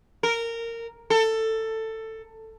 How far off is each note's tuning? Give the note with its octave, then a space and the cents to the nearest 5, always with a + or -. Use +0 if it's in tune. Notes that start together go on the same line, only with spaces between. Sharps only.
A#4 -15
A4 +15